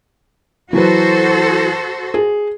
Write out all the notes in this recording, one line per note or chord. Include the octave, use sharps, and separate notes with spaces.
E3 F#3 F#4 A4 B4 C5
G#4